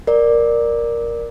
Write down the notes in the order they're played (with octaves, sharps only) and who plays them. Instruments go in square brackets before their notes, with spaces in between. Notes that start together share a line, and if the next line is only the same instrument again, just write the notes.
[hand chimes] A#4 D5